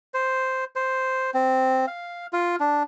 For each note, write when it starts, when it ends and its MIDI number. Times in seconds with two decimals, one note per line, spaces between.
0.14 0.64 72
0.76 1.31 72
1.34 1.86 60
1.87 2.26 77
2.33 2.56 65
2.60 2.83 62